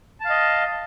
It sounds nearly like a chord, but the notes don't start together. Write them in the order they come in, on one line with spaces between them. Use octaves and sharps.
A5 F5 D#5